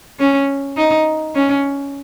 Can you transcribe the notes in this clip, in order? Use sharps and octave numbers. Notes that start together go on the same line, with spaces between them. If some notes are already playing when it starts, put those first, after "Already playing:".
C#4
D#4
C#4